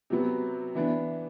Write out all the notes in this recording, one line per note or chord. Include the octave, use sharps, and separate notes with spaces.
C3 F#3 B3
E3 B3 D4